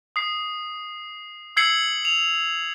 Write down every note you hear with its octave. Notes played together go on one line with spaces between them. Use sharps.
D#6 C7
E6 G#6 C7 C#7 F#7
F7